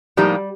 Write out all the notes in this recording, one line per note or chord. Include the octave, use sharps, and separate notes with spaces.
A2 F3 G3 A#3 D#4 G4